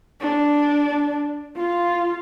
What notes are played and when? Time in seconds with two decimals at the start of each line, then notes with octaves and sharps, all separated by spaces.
0.21 D4
1.56 F4